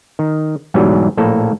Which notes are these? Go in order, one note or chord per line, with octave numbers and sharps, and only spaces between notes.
D#3
E2 G#2 B2 E3 F#3 G3
A#1 A2 A#3 A4